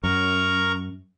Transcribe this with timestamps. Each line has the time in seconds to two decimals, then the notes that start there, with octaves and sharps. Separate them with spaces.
0.04 F#2 A#4 A#5 C#6